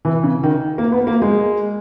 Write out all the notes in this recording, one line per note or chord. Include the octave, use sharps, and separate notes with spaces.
E3
C#3
D#3
A#3
B3
A#3
G#3